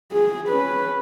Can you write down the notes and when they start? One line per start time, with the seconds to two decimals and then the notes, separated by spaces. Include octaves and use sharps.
0.12 G#4
0.49 C#4 B4